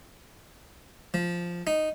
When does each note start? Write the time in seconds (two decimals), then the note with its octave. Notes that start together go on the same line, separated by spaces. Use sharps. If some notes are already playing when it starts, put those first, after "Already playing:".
1.14 F3
1.67 D#4